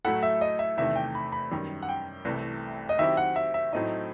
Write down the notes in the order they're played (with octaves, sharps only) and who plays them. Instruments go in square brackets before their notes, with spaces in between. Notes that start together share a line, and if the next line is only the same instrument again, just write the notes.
[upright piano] A2 F#3 A3 E4 A4 [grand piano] F#5
[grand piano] E5
D#5
E5
[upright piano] E2 C3 D#3 A3 [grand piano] E5
[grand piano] G5
B5
B5
[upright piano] F#2 D#3 G3
[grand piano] F#5
G5
[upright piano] C2 C3 E3 A3
[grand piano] D#5
[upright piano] D#3 F#3 C4 E4 G4 [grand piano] E5
[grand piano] F#5
E5
E5
[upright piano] A2 F#3 A3 C4 D#4 [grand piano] D#5